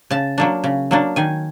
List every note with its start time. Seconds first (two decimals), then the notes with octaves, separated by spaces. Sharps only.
0.10 C#3 A5
0.38 F#3 A#3 D4
0.64 C#3
0.91 F#3 A#3 D4
1.16 D#3 G#5